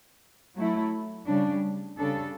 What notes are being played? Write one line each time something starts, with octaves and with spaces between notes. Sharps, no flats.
F#3 A3 E4
C#3 G3 D4
C#3 G3 D4 A4